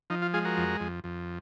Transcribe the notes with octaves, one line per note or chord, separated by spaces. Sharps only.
F3 D#4
F4
G#3 F4 G#4
F#4 A#4
F2
F2
F2